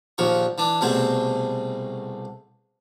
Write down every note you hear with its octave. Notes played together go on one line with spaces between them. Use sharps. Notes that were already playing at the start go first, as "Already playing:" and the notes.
A#1 D#2 F3 C#6
E3 D4
C2 B2 A3 G#4 C5